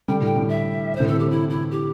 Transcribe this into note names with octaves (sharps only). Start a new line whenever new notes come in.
D3 G3 G5
A2 D3 G5
A2
E5
A2 D3 C5
C3 E3 A4
G4
E4
E4
G4